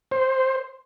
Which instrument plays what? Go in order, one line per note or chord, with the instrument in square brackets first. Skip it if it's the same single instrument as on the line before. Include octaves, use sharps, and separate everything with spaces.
[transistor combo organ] C5